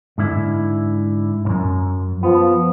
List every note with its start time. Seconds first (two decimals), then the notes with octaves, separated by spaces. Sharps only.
0.18 G#2 D3 E4
1.45 B1 F#2
2.23 F3 B3